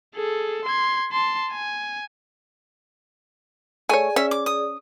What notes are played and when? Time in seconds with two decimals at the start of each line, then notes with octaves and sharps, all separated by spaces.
0.15 G#4 A4
0.65 C6 G#6
1.12 A5 C6
1.52 G#5
3.89 A3 G#4 C#5 D5 G#5
4.16 C#4 E5
4.31 D6
4.46 D#6